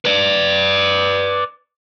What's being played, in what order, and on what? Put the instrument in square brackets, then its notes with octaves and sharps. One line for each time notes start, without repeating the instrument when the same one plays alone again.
[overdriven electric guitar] B4 D5